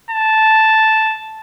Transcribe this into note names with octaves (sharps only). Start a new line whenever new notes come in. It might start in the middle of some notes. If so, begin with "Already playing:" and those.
A5